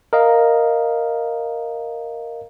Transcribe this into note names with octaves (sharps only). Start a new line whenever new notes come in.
A#4 D#5 F5